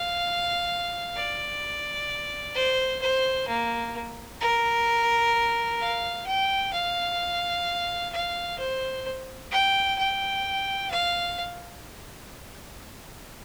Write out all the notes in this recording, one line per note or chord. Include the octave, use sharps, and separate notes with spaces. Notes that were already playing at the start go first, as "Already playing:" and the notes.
Already playing: F5
D5
C5
C5
A#3
A#4
F5
G5
F5
F5
C5
G5
G5
F5